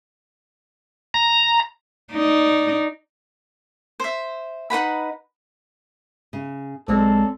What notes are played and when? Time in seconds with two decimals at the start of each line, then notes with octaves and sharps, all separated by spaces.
1.14 A#5
2.12 D#4 D5
4.00 C5 E5
4.70 D#4 B4 F#5 B5
6.33 C#3
6.88 B1 G#3 C4 A4 C#5 D5